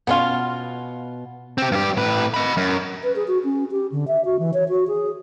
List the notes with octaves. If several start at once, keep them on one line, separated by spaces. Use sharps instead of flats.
B2 B3 C#4 F4
C4 G4
G2 G4
A2 B4
D#5 B5
F#2
B4
G#4
F#4
C#4
G4
D3
E5
F#4
E3
C#5
F#4
G#4